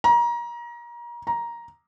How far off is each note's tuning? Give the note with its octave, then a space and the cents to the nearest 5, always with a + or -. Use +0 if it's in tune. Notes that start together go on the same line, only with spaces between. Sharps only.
A#5 +30
A#5 +10